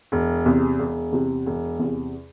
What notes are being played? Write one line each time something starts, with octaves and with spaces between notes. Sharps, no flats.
E1
E2 C3
E1
E2 C3
E1
E2 C3